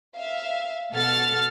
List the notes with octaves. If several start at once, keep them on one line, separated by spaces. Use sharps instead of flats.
E5 F5
B2 A4 F#5 F6 A6